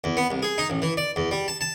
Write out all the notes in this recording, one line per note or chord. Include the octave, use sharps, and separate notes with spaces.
E2
B3
C2
G#4
D#4
A1
E3
D5
E2
G3
A5
A5